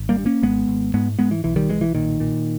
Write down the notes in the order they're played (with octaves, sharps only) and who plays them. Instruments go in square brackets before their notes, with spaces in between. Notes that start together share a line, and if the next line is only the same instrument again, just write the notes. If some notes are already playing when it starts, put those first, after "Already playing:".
Already playing: [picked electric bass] G#1
G3 A#3
G2
A#3 C#4
G#1 G#3 B3
G#1
G#2 G#3 B3
G#2 G#3 B3
E3
B1 E3
D#3 G3
B1 E3 G#3
E3
A#2 D#3
A#2